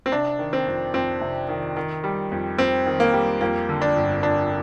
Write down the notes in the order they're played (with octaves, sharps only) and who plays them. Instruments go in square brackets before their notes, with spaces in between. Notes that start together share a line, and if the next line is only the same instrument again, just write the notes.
[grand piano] C4
C3 D4
D#3
C4
F2
F2 C4
C3
D#3
D#3
G3
F2
F2 C4
D#3
A#3
G3
F2 A#3
D3
D4
G1
G1 D4